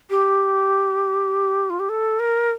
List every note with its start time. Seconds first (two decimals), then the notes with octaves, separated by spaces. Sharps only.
0.10 G4
1.70 F4
1.80 G4
1.89 A4
2.20 A#4